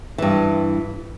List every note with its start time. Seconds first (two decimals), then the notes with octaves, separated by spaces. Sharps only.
0.18 G2 E3